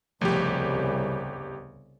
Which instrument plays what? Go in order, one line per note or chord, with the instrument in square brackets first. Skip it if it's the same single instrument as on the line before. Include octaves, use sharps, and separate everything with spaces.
[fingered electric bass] D1 F3 A3 [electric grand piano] G1 G4 [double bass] C2 C#3